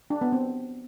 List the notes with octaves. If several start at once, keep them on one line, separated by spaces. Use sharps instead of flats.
D4
B3
C4